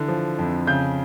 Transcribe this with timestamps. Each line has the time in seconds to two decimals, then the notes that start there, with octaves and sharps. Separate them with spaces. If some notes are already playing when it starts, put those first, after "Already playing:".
Already playing: D3 E3
0.08 F3
0.39 F2
0.67 C#3 G6